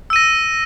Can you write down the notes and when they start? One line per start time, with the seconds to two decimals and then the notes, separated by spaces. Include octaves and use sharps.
0.10 E6
0.13 D#7
0.16 A#6